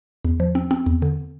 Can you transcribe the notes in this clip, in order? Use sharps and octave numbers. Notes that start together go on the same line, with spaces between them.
E2
F3
C4
C4
E2
D3